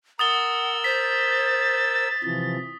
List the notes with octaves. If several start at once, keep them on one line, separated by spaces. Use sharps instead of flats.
A#4 F#5 D#6 E6 A6 G7
C5 A6 B6
C3 E3 F3